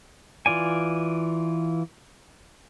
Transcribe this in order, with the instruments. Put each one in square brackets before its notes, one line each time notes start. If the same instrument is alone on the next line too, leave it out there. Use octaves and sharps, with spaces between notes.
[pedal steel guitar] E3 F4 D5 G#5